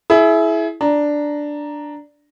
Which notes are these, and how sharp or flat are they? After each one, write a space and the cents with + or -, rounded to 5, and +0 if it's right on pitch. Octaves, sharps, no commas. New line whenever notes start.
E4 +0 G#4 +30
D4 +0 A#5 +0